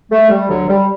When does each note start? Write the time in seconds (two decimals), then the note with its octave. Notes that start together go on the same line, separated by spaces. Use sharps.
0.11 A3
0.30 G3
0.49 D2 D3 F#3
0.68 G3